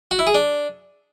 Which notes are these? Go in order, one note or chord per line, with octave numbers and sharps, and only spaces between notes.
F#4
E4
G#4
D4